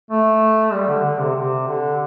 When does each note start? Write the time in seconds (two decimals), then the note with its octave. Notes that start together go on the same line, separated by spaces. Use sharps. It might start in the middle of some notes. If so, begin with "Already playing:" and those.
0.11 A3
0.73 G3
0.88 D3
1.04 D3
1.20 C3
1.36 C3
1.67 D3